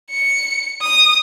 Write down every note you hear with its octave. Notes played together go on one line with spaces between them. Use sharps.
C#7
D#6